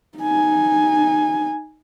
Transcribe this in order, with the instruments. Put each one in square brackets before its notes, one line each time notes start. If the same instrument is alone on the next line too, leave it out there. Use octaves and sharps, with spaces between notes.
[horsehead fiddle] D#4 G#5